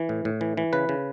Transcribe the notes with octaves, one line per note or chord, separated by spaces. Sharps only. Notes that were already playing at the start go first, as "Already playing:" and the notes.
Already playing: E3
A2
A2
E3
E3
C#3 B4
C#3